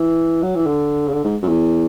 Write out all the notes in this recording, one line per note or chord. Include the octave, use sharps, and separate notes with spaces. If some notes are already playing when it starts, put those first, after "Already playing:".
Already playing: E3
F#3
E3
D3
C#3
D3
G#2
F#2
E2